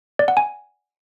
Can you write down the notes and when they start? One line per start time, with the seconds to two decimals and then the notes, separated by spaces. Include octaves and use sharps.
0.19 D5
0.28 F#5
0.37 G#5